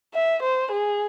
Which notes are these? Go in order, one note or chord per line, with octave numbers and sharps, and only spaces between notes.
E5
C5
G#4